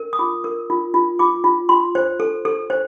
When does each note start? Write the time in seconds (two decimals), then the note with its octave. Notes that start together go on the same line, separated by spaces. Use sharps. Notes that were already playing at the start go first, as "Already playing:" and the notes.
Already playing: A#4
0.13 D#6
0.19 F4 D6
0.44 A#4
0.70 F4
0.94 F4
1.19 F4 D6
1.44 F4
1.69 F4 C6
1.95 C5
2.20 A4
2.45 A4
2.70 C5